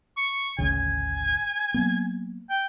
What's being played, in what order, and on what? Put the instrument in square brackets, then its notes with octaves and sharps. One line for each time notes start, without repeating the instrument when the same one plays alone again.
[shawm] C#6
[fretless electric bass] G#1 D2 C#3 [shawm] G#5
[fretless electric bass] F#3 A#3 B3
[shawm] G5